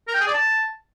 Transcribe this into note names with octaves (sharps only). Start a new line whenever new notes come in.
A#4
G5
G#4
D5
A5